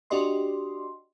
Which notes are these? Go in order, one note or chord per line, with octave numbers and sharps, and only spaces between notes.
D4 F#4 G4 D5 D#5 C6